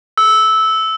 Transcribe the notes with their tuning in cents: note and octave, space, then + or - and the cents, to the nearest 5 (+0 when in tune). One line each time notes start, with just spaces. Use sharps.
E6 -10